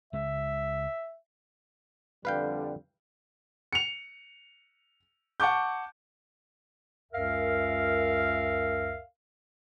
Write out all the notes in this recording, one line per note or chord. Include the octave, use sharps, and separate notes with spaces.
C#2 G#3 E5
F2 D3 G3 B4 F5 G5
C#7 F7
F#5 A5 C#6 D6 G6
C#2 F#2 A#4 E5 F5